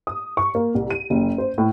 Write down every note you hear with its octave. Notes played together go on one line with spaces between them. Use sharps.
D#6
C#6
A#3
C2
D#7
F#1
C5
A2